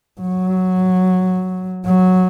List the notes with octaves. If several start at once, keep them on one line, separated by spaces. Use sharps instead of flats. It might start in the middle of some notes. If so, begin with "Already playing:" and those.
F#3
F#3